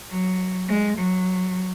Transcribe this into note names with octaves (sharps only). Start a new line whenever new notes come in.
F#3
G#3
F#3